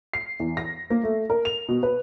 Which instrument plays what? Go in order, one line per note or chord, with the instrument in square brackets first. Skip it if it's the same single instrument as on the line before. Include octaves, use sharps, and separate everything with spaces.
[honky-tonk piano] C7
E2
A#6
A#3
A3
A#4
F7
B2
B4